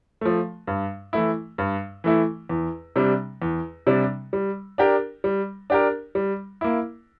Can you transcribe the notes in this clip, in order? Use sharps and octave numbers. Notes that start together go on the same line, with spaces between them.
F3 A3
G2
E3 A3 E4
G2
E3 A3 E4
E2
C3 G3 D4
E2
C3 G3 D4
G3
D4 G4 A#4
G3
D4 G4 A#4
G3
A#3 E4